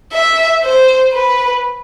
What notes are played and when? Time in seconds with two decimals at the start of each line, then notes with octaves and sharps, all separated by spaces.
0.12 E5
0.63 C5
1.13 B4